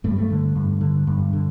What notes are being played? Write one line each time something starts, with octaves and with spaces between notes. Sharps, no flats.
G2 A3
G3
A3
D3
G2
D3
G2
D3